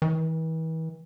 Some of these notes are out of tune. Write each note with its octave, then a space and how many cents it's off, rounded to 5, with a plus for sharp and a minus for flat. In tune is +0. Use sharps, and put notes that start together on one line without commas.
E3 -40